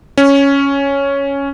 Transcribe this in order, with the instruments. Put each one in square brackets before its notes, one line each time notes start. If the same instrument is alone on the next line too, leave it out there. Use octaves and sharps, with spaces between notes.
[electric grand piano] C#4